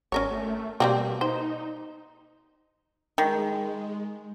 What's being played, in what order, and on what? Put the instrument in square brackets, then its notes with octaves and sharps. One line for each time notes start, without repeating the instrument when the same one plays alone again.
[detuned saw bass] G#1 [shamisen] C#4 A#4 C#5
[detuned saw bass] A3
[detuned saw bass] B2 [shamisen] G3 A#3 C4
[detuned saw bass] D#4 [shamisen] C5
[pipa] D#3 [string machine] G#3